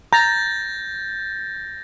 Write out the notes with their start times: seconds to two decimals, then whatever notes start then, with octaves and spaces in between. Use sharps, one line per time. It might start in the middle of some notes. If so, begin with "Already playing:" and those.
0.13 A#5 G6 A6 A#6